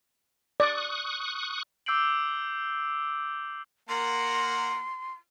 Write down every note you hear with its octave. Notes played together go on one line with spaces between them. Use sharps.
D5 C#6 D#6 F#6
D6 E6 G6 C7 D7 F#7
A#3 A#4 F#5 C6